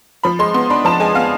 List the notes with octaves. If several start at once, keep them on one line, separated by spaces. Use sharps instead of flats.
F3 B5
G#3 C6
B3 C6
D4 B5
F3 A5
G#3 G#5
B3 F5